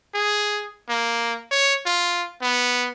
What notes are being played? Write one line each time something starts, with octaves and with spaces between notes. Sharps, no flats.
G#4
A#3
C#5
F4
B3